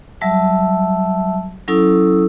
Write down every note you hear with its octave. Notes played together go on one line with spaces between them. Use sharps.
F#3 G3 E5 A5 E6
F#3 C#4 E4 A4 D#6 E6